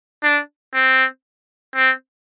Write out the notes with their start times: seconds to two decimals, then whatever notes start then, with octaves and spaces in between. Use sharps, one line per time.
0.24 D4
0.74 C4
1.76 C4